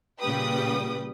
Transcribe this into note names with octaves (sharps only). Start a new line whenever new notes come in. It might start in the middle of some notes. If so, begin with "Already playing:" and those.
A#2 C#3 G3 B4 G5 D#6